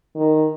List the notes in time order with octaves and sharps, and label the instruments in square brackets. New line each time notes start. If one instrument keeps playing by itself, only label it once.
[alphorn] D#3